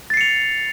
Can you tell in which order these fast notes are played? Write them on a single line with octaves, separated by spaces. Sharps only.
A6 C7 C#7 F7